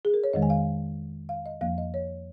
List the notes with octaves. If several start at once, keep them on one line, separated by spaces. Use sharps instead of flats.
G#4
A#4
C#5
F2 D#3 G#3 D#5
G#5
F5
F5
D#5
F2 F3 A#3 F5
D#5
C#5